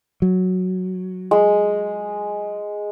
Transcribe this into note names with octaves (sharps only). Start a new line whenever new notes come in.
F#3
G#3